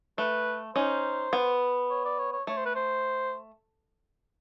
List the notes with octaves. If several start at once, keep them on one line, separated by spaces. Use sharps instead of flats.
A3 B4
C#4 D#4 C5
B3
C#5
D5
C#5
C#5
A3 C#5
C5
B4
C5